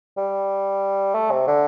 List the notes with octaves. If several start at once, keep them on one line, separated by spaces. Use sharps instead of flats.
G3
A3
C3
D3